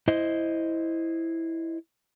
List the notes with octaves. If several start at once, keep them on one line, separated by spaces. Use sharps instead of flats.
E4 C5 D#5